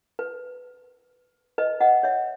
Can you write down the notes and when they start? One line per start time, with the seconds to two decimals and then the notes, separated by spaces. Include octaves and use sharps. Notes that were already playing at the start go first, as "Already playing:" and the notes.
0.19 B4
1.58 B4 D#5
1.80 D#5 F#5
2.03 C#5 E5